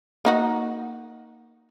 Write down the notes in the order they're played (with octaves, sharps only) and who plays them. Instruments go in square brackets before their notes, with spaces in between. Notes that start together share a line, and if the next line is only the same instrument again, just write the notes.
[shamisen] A#3 D#4 F#4